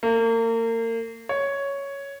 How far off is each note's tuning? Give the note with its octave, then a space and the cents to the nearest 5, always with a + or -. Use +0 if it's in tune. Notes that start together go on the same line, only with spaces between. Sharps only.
A#3 -35
C#5 +5